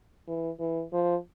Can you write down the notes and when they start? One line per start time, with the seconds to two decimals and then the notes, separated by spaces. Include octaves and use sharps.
0.28 E3
0.60 E3
0.93 F3